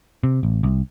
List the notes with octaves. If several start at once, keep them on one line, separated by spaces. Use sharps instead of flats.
C3
A1
C2